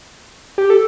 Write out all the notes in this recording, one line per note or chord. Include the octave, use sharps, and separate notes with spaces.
G4
A4